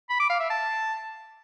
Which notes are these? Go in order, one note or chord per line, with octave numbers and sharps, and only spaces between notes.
B5
D6
F5
E5
A5